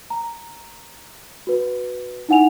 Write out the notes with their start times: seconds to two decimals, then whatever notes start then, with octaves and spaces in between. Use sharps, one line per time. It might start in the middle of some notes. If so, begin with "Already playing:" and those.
0.10 A#5
1.47 F#4 B4
2.29 D#4 E4 F#5 G#5 F7